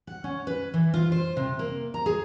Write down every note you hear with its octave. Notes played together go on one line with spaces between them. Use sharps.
F#5
C#4
B4
E3
F4
C5
C3
A#3
A#5
G#4